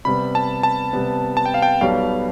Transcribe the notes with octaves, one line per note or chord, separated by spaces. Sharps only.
C3 G3 B3 B5
A5
A5
C3 G3 B3
A5
G5
F5
G5
B1 B2 G3 B3 F5